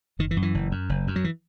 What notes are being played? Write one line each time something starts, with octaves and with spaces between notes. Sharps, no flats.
F#1 D#3
E3
F#2
E3
F#1
F#2
F#1
F#2
F#3
E3